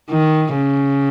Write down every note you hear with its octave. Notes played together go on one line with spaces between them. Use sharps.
D#3
C#3